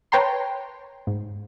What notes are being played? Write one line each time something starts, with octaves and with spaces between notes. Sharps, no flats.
B4 C#5 G5 A5 A#5 C6
G#2